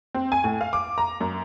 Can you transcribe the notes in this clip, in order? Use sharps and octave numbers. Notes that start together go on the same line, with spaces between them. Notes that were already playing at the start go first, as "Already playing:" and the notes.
C4
G#5
A2
F5
D6
A#5
F#2